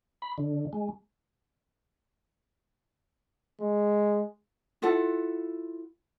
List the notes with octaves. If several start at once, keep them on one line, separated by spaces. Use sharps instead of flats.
B5
D3
G#3
G#3
E4 F4 A4 F#5